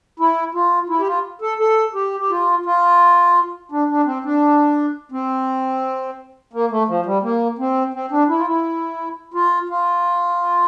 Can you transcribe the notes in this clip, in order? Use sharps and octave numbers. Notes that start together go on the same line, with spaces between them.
E4
F4
E4
G4
F4
A4
A4
G4
G4
F4
F4
D4
D4
C4
D4
C4
A#3
A3
F3
G3
A#3
C4
C4
D4
E4
F4
E4
F4
F4